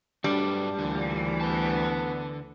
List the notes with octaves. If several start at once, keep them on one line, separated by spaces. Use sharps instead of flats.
D2 G2 F#3 G3 D4 B4
D2 A#2 D3 E3
D3 B3 A5